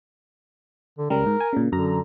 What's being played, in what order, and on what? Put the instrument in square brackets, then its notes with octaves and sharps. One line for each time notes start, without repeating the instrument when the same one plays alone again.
[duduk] D3
[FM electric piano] C#2 C#3 G3 [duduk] A#4
[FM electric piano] G#2
G#5
A#2 C#3
[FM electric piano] F#2 A#5 [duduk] D3